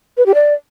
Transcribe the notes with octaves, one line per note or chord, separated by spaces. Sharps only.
B4
G4
D5